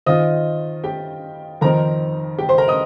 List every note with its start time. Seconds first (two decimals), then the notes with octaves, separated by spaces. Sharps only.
0.06 D#3 C4 F4 D#5 D#6
0.84 G4 G5
1.61 F2 D#3 C4 D#4 A#4 A#5
2.38 G4 G5
2.49 C5 C6
2.58 A#4 A#5
2.68 D#5 D#6